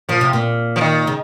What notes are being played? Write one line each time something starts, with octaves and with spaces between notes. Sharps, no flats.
A#2 F3
C3
A#2
F3
D#3
C#3